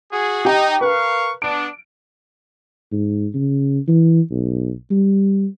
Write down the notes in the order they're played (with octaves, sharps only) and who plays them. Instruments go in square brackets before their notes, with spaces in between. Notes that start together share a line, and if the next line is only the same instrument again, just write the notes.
[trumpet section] F#4 G#4
[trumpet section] D#4 [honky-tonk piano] G4 G5
[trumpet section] A#4 F5 C#6 [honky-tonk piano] B4
[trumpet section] B3 D4 [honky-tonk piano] D7
[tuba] G#2
C#3
E3
B1
G3